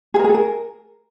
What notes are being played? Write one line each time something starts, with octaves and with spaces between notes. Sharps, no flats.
G#4
A#4
G#4
A4
A#4